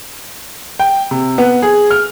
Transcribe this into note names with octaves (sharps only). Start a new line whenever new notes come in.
G5
C3
B3
G#4
F6